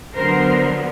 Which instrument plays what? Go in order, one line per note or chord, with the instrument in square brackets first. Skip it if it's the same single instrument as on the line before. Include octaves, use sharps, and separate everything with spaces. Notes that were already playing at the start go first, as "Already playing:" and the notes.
[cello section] D3 F#3 B3 A#4 C5